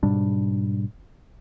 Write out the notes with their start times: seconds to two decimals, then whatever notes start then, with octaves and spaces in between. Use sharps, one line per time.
0.03 G#2 B2 G3 D4